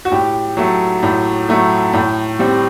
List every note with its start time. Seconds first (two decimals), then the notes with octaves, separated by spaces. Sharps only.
0.05 F#4
0.12 A2 G4
0.57 F#3 A3
1.03 A2
1.49 F#3 A3
1.93 A2
2.39 G3 C4